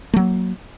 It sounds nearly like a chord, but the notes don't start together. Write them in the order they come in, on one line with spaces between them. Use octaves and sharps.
A3 F#3 A#3